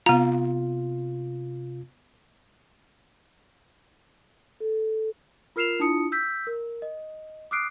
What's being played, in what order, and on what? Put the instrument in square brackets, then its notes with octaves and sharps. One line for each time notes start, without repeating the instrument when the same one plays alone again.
[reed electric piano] C3 F4 [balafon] B3 A#5
[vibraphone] A4
[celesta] F4 A#4 F6 C7 E7 F7
D4 E4 F4 A5 D#6 C#7
E6 G6 B6
A#4
D#5
D6 D#6 F6 F#6 C7 D7